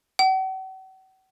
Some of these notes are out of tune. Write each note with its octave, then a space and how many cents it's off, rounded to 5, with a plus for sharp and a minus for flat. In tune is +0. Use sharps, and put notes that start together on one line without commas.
F#5 +45